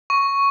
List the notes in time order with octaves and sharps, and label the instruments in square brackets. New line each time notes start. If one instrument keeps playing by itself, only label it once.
[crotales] C#6